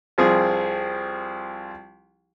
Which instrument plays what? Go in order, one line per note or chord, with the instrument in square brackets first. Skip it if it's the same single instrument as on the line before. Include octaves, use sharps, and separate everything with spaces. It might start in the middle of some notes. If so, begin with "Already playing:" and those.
[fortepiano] C2 F3 C4 G#4